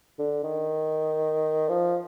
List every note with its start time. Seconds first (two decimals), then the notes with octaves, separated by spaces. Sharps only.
0.19 D3
0.43 D#3
1.69 F3